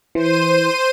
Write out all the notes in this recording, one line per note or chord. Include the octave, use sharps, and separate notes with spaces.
E3 C5 D#7